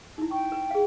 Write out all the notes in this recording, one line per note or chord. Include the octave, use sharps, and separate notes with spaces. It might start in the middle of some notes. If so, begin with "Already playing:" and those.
D#4 E4
G5 C#6
B4
G#4 F5